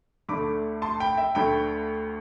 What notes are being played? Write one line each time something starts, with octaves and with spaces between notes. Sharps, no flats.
D2 D3 A3 B5 D6
A5 C6
G5 B5
E5 G5
D2 D3 A3 G5 B5